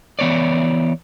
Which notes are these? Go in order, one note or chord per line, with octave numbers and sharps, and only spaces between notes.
E3 B3 C#5 D5